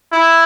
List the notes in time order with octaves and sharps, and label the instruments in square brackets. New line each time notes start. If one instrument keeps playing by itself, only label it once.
[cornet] E4